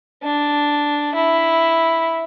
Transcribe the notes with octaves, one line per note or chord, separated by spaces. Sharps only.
D4
E4